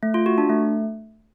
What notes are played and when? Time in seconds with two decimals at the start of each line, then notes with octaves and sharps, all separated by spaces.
0.03 A3
0.14 F4
0.26 F#4
0.38 D4
0.49 A3